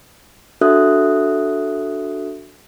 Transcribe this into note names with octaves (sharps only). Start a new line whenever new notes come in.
D4 F#4 A4 E5 D#6 F#6